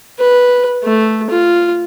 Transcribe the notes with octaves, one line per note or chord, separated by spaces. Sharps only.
B4
A3
F4